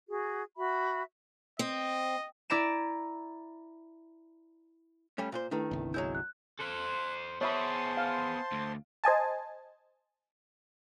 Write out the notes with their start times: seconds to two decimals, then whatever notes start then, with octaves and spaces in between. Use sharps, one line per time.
0.08 F#4 G#4
0.57 F#4 E5 B5
1.59 C4 D#5
2.50 E4 D5 A#5 D7 E7
5.18 G3 A3 C#4
5.32 A#2 B4 C5
5.51 D#3 A3 D4 E4 B4
5.71 G1 C2
5.94 F#3 G#3 E4 C#5 G6
6.15 F#6
6.60 A4 C5 F#6
7.41 B3 G#4 C5 C#5 E5 A5 B5 C6
7.97 F5
8.52 D2
9.04 C5 D#5 G#5 A5